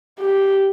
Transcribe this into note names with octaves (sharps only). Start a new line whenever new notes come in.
G4